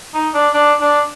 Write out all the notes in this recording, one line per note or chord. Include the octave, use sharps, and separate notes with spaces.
D#4
D4
D4
D4